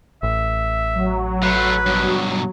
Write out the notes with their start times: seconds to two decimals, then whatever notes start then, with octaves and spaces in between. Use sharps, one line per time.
0.23 A1 E5
0.94 F#3
1.43 A3 F4 B4
1.86 G2 B2